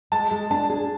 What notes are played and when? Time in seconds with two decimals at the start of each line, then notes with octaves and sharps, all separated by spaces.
0.12 G#3 A5
0.31 G#3
0.51 D4 A5
0.70 G#4